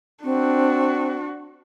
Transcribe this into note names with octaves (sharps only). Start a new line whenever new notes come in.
C4 D4 F#4